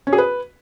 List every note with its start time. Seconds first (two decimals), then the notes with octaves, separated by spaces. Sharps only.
0.07 C#4
0.13 G#4
0.18 B4